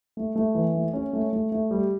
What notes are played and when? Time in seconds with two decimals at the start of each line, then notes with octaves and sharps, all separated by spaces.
0.17 A3
0.36 A3
0.55 E3
0.74 A3
0.93 C#4
1.13 A3
1.33 A3
1.52 A3
1.71 G3